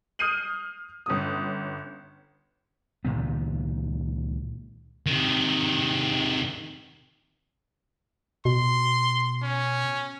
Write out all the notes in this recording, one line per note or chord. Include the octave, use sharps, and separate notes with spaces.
D#6 F6 G6 C7 D#7 F#7
G1 C#4 D#6
C#2 A#2 D#3 B3
C3 D#3
B2 C6
C#4